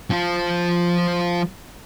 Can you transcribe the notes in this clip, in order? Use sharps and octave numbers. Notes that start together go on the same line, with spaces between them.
F3 F4